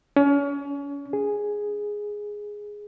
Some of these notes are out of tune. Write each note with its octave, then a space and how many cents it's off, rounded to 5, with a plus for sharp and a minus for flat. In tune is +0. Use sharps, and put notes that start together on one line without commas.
C#4 +35
G#4 +0